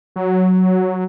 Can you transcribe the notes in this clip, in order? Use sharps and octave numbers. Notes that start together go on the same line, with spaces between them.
F#3